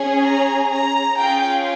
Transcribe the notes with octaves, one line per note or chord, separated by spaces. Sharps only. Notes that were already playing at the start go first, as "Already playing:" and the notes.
Already playing: C#4 G#4
A#5
A#5
C#4 F4 G#4 G5